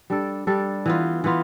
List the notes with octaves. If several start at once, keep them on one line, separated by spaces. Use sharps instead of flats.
G3 D4 A4
G3 D4 A4
E3 B3 F4
E3 B3 F4